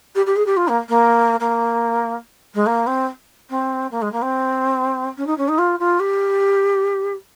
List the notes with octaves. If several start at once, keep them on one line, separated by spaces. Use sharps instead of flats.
G4
G4
G#4
G4
F4
A#3
A#3
A#3
G#3
A#3
C4
C4
A#3
G#3
A#3
C4
C#4
D#4
C#4
D#4
F4
F4
G4